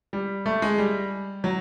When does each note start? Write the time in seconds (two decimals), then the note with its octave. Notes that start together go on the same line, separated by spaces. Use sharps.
0.13 G3
0.46 A3
0.62 G#3
0.78 G3
1.44 F#3